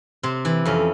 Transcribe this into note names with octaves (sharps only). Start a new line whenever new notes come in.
C3 C4
E3
F2 C#4